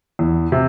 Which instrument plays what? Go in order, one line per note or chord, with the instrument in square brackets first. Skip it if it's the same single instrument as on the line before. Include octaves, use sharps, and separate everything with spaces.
[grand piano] E2
C3